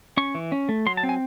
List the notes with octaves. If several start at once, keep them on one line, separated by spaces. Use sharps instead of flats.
C#4 C#6
E3
C#4
A3
F#3 C6
A5
C4
G#5